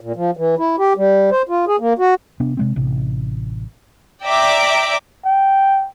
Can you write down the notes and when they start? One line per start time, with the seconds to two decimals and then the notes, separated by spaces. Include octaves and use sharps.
0.01 A#2
0.16 F3
0.37 E3
0.58 E4
0.78 G4
0.97 G3
1.31 C5
1.49 F4
1.67 G#4
1.79 A#3
1.99 F#4
2.40 C3 B3 D4
2.57 C3 G#3 C4
2.76 A1 C3
4.23 D5 E5 G5 A#5 D6
5.25 G5